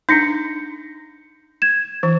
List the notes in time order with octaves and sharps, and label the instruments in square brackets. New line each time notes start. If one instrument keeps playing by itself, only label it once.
[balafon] D4 D#4 [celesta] G6 A#6 C#7
[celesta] G#6 E7
[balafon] E3